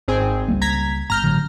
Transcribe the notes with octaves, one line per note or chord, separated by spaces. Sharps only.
G#1 C4 G#4
C#2 G3 A#3
A#5 G#6 B6
G1 A#5 F6 G6
A1 D3 F#3